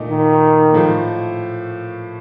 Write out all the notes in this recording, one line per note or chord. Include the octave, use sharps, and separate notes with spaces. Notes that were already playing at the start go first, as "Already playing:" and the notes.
Already playing: A#2 A3 D#4
D#3
A2 F3 A3